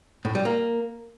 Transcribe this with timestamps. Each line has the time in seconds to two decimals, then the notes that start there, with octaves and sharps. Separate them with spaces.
0.25 A2
0.35 G3
0.45 A#3